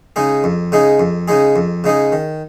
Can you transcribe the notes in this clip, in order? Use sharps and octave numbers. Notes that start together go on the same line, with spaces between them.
C#3 G#3 D#4 G#4
F2
C#3 G#3 D#4 G#4
F2
C#3 G#3 D#4 G#4
F2
C#3 G#3 D#4 G#4
D#3